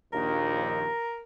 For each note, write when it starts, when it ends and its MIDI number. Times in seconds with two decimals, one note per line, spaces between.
0.13 0.86 34
0.13 0.86 39
0.13 1.23 70